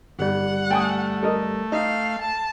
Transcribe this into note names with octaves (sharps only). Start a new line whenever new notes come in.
G1 G3 F#5
A3 G5 G#5 D#6
A4 A#4 D#5
D#4 F5
A5